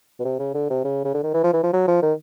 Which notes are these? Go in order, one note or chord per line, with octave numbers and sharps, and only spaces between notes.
B2
C3
C#3
D3
C3
C#3
C#3
D3
D#3
E3
F3
E3
F3
F#3
F3
D#3